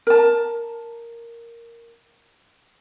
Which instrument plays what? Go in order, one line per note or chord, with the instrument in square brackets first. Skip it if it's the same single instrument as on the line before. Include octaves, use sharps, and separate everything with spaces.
[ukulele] A#4 A5